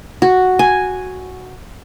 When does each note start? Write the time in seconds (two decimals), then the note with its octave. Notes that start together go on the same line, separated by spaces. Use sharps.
0.22 F#4
0.59 G#5